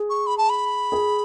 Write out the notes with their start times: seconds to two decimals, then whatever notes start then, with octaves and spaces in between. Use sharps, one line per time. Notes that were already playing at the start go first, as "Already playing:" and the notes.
Already playing: G#4
0.10 C#6
0.27 B5
0.38 A5
0.49 B5
0.92 G#4